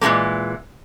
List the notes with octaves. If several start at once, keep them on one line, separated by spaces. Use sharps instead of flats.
A#2 E3 F3 G#3 A#3